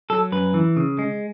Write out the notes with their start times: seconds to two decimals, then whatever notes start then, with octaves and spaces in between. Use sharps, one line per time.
0.10 F#3 A4
0.32 F#2 B4
0.54 E3
0.77 C#3
0.99 G#3